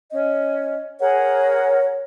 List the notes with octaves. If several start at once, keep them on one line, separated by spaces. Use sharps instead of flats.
C#4 D#5
G#4 A#4 C#5 F#5